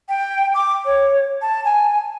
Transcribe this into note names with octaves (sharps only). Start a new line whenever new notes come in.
G5
D6
C#5
A5
G#5